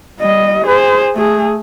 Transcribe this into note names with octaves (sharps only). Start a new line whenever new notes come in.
G3 D#5
G#4 C5
A3 G#4